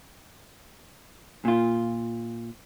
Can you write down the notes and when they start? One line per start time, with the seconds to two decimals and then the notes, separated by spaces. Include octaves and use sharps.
1.45 A#2 F4